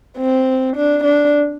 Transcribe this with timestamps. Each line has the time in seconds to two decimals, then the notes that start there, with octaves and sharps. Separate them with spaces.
0.18 C4
0.77 D4
1.04 D4